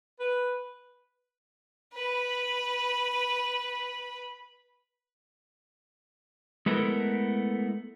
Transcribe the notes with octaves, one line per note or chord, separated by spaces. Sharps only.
B4
B4 B5
G#3 A3 B3 E4 A4 A#4